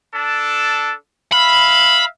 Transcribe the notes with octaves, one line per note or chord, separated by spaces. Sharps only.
D4 A4
E5 F5 B5